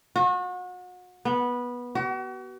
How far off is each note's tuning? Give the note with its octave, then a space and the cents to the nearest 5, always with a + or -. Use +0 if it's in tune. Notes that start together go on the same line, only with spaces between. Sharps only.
F#4 -35
B3 -15
F#4 +40